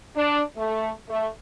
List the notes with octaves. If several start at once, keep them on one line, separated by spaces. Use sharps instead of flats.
D4
A3
A3